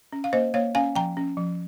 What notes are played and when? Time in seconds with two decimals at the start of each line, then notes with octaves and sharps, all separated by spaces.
0.13 C#4
0.24 F5
0.33 A#3 C5 D#5
0.54 A#3 C#5 F5
0.75 C#4 F5 G#5
0.95 F3 G5 A#5
1.17 C#4
1.37 F3